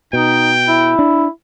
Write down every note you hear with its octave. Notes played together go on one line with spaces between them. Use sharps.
B2 D#4 G5
E4
D4